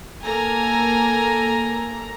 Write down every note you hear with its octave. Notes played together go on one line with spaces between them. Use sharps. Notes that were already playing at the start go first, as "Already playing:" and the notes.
A#3 A4 G#5 A#5